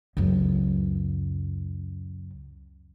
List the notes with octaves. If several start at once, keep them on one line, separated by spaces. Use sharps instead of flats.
C#2 F#2